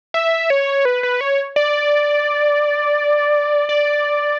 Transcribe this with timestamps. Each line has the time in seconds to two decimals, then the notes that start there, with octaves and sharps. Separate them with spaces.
0.14 E5
0.50 C#5
0.85 B4
1.03 B4
1.21 C#5
1.56 D5
3.69 D5